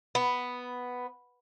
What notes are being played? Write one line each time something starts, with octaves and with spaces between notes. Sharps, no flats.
B3